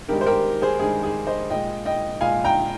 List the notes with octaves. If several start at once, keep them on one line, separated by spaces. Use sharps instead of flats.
G2 D#3 G#3 G4 A#4
C5
G4 A#4
G#4 C5
G2 D#3 G#3 G#4
G#4
C5 D#5
A#2 G#3 D#5 G5
D#5 G5
A#2 G#3 F5 G#5
G5 A#5